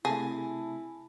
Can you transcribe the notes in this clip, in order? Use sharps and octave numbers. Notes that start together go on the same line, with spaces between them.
C3 A3 E4 G#4 G#5 A5